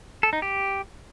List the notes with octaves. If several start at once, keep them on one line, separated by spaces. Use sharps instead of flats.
A4
D#4
G4